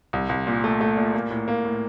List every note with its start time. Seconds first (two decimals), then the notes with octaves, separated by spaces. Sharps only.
0.13 C2
0.29 C2
0.47 A#2
0.64 A3
0.81 A3
0.97 A#2
1.14 A#3
1.30 A2
1.48 A#3
1.65 A2